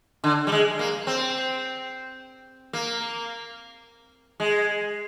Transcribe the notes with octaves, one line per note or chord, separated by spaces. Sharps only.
D3
G3
G#3
A#3
C4
A#3
G#3